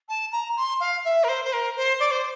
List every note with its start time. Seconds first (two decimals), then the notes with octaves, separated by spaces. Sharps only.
0.09 A5
0.32 A#5
0.57 C6
0.80 F5
1.05 E5
1.24 A#4
1.28 C5
1.45 C5
1.53 A#4
1.76 C5
2.00 D5
2.11 C5